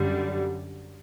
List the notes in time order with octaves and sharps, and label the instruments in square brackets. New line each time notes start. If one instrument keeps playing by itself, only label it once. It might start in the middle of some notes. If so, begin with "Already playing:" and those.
Already playing: [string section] F#2 D3 G3